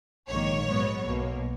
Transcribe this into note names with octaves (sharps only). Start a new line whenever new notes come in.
A#1 G#2 D#3 A#3 C#5
G#2 F#3 B3
B1 B2 A#3